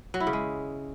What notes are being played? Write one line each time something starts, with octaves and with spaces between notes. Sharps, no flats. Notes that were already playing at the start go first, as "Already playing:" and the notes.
F#3
E4
C#3
G#3